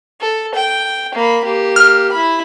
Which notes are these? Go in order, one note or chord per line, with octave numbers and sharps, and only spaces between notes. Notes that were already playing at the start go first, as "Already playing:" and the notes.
A4
G5
A#3 B5
A#3 G4
F6
E4 B5